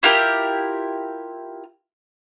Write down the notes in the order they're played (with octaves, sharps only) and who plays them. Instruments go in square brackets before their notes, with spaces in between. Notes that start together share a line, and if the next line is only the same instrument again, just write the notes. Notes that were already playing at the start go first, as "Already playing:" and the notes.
[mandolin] E4 F4 G4 A#4